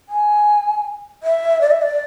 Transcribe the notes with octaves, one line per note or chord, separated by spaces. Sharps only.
G#5
E5
D5
E5
D5